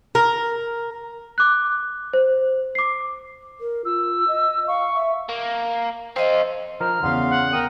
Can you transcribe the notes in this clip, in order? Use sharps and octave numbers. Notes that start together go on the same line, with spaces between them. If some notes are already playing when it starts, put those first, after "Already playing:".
A#4
D6 F#6
C5
D6 C7
A#4
F4 E6
D#5
F5 C#6
E5
A#3
C4 F4 C5 D#5
F3 A#4 C5 A#5 F6
E2 C#3 B3 F5 C6
F#5
A#4 G5 D#6